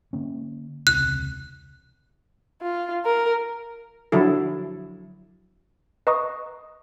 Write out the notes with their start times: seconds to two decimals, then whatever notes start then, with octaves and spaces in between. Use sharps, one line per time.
0.13 D3 A#3 C#4
0.87 E1 C#2 C3 F#6
2.62 F4
3.05 A#4
4.12 D3 F3 F#3 E4 A4
6.07 B4 D#5 A#5 C#6 D#6